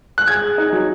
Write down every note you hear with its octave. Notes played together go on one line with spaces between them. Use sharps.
F#6
G#4 G#6
G#4
D#4
F#3